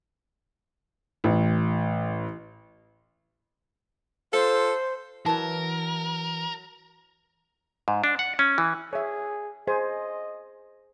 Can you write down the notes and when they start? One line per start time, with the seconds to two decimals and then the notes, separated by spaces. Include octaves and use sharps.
1.24 A1
4.33 F4 A4 C5
5.26 E3 F#3 A#4 A5
7.88 G#2
8.04 D4
8.19 F#5
8.39 C#4
8.58 E3
8.93 G#4 C#5 E5
9.67 G#4 C5 D#5 G#5